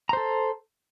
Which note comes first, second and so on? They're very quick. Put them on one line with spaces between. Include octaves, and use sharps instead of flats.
A#5 C5 A4